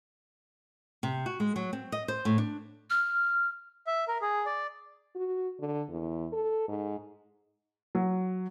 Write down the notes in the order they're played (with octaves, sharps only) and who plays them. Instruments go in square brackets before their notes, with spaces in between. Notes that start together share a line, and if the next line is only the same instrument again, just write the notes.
[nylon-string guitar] C3
F#4
G#3
F#3
C4
D#5
C5
A2
D4
[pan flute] F6
[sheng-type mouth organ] E5
A#4
G#4
D5
[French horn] F#4
D3
E2
A4
G#2
[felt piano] F#3